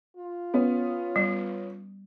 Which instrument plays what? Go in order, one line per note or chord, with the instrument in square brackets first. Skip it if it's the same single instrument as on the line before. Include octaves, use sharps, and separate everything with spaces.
[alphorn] F4
[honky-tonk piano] B3 C#4
[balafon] G3